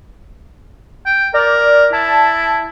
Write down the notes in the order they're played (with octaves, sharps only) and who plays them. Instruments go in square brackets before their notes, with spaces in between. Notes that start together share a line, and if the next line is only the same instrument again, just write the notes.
[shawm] G5
[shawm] A#4 [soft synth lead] D5
[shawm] E4 [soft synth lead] A5